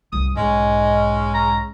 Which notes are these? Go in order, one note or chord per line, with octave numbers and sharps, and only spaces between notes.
C2 F#2 D#6
B1 G#2 G#3 C#4 D#5
A#5